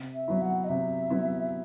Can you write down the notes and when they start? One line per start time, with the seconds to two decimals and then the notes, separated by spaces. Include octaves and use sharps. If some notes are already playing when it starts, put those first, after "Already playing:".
Already playing: C3
0.15 E5
0.28 F#3 B3 E4
0.42 F#5
0.64 D#5
0.69 C3 E5
1.10 F#3 B3 E4